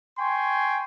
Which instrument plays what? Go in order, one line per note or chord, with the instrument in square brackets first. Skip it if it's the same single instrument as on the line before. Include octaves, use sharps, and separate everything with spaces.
[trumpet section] G5 G#5 C6 C#6